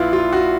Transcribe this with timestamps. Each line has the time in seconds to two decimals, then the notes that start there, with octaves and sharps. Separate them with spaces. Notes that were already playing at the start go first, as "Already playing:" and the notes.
Already playing: A#1 E4 F4 B4
0.13 F4
0.33 F#4